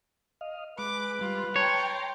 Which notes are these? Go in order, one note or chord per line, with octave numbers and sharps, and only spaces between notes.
D#5 F5
G#3 B4 D6
G3 F4
C#5 G5 A5 A#5 C6